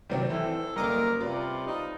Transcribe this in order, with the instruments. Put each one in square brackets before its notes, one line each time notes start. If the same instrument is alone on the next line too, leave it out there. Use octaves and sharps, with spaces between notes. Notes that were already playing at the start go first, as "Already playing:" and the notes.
[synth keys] C3 F#3 G3 [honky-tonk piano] D#3 C4 D5
[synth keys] E3 [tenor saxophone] A4
[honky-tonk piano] F#1 A#3 [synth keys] G3 D#5 D6 [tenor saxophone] A#4
[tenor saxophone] C3 [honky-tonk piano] F4 B4 D5
[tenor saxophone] D#4